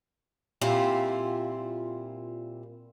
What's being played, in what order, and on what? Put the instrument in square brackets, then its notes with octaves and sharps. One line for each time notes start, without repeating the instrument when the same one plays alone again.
[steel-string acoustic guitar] A#2 G3 C4 E4 F4